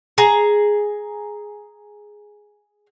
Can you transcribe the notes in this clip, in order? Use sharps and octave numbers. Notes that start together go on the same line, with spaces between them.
G#4 A#5